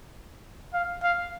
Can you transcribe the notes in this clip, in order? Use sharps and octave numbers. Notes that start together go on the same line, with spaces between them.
F5
F5